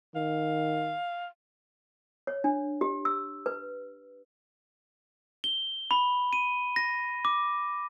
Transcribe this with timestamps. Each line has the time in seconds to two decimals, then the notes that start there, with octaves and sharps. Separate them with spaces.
0.15 D#3 F5
2.27 C#5
2.44 D4
2.81 G4
3.05 E6
3.46 B4
5.44 G7
5.91 B5
6.33 D#7
6.76 A#6
7.25 D6